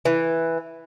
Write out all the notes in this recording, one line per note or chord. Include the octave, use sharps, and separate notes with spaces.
E3